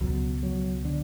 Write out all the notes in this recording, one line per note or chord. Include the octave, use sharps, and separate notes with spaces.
C#2 B2 F#3
F#3
D3